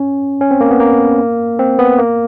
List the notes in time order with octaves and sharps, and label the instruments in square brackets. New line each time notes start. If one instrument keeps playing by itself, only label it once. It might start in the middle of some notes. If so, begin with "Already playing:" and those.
Already playing: [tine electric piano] C#4
C#4
C4
A#3
B3
A#3
C4
B3
A#3